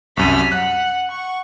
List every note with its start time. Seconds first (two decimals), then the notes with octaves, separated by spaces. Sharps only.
0.17 C2 F#2 F6 B6 D#7
0.52 F#5 F#6
1.11 F#5 C#6